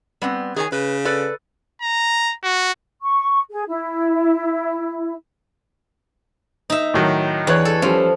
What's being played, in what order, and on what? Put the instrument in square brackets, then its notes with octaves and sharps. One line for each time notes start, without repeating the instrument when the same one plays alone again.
[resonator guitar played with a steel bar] G3 B3 C4
[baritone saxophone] D#3 [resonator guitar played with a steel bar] G#4 C#5 G#5
[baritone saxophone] C#3 [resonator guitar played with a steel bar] B4
[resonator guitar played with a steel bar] A4 B4 D5
[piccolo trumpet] A#5
F#4
[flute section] C#6
G#4
E4
[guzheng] D#4 E5
[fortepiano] A2 D#3 F#3
[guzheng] E2 [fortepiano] D4 B4 C#5
[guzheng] A4
[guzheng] F3 [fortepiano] G3 C#4